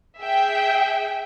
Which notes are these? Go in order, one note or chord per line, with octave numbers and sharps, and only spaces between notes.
G#4 E5 G5